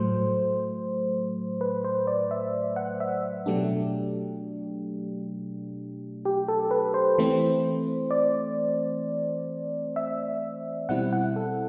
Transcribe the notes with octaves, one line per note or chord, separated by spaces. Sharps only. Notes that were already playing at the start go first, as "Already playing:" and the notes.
Already playing: A2 F#3 A3 C5
B4
C5
D5
E5
F#5
E5
B2 F#3 A3 D4 G4
G4
A4
B4
C5
E3 A3 C4
D5
E5
B2 G3 C4 E4 F#5
F#5
A4